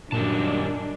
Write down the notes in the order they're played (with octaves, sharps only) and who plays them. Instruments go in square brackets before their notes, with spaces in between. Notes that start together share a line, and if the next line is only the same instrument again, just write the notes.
[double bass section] F#2 [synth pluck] A#2 [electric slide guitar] D#3 G3 A5 [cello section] D4